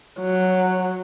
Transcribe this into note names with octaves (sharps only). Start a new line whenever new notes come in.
F#3